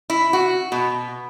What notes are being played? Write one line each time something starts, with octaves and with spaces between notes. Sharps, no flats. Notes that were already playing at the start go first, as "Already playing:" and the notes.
E4
F#4
B2